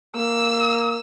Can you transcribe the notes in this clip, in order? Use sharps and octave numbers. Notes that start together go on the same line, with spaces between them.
A#3 E6